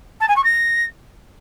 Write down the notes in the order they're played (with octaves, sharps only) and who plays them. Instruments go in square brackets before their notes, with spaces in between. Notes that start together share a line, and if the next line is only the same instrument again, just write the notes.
[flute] A5
G#5
C#6
A#6